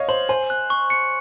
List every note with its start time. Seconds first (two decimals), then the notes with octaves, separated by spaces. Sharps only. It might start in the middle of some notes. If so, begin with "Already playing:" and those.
Already playing: C#5 D#5 F5
0.09 C5 F#7
0.29 C5 G#5
0.50 F#6
0.70 C#6
0.90 C#7